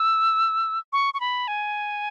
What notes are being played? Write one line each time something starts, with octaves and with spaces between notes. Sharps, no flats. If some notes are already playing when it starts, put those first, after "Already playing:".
Already playing: E6
C#6
C#6
B5
G#5